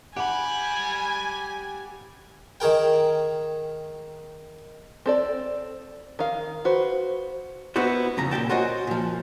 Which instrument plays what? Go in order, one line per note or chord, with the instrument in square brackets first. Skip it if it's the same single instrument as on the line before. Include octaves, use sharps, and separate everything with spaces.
[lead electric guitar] G4 B5 [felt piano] F#5 [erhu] G#5
[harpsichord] D#3 G#4 A#4 G5
[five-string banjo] C4 A4 D5
D#3 F5
F#4 B4 C5
[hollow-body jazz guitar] B3 D#4 E4 F#4 C5
F2 C#3 A#5
A#2 F3 G5 A5
F4 F#4 C5 C#5 D#5 G#5
A#2 F3